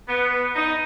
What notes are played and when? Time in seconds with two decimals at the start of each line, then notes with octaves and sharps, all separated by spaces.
0.08 B3
0.55 D#4